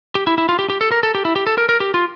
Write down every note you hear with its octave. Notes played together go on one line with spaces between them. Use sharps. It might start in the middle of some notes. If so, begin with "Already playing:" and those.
G4
E4
E4
F4
G4
G4
A4
A#4
A4
G4
E4
G4
A4
A#4
A#4
G4
F4